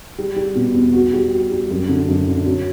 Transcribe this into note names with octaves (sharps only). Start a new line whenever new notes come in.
G3
G3
B2
E2
F#4
G3
F#4
G3
F#2
D3
F#2
D3
F#3